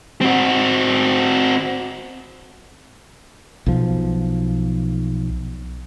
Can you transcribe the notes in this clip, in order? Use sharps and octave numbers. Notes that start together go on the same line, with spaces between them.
C4 F#4
B1 F3